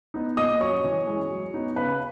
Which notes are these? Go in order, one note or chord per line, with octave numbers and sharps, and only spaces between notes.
B3 D#4
A#2 D#5 D#6
F#3 C#4 C#5 C#6
E3
G#3 C#4 E4
F#3
B3 D#4
C#3 B4 B5